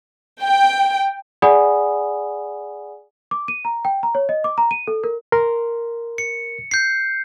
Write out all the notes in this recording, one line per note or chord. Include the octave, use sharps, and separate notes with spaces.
G5
G#4 D5 F#5 G#5 B5 D#6
D6
D#7
A#5
G5
A#5
C#5
D#5
D6
A#5
D#7
A4
A#4
A#4 C6
C#7
G6 C7